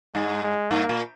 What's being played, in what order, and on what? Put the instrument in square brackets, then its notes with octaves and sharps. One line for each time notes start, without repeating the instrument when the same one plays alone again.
[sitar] G2 [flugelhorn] G#3
[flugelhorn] G#3
[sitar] G2 [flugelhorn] A#3
[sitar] A#2